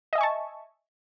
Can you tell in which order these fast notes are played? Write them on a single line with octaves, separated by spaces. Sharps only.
D#5 E5 G#5 C#6 A5